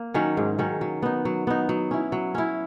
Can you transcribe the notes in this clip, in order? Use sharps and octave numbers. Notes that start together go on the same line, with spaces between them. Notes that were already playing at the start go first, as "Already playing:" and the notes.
Already playing: A#3
D#3 F#3 C#4
G#2
D#3 F#3 C#4
F#3
B3 D#4
F#3
B3 D#4
F#3
C#4 E4
F#3
C#4 E4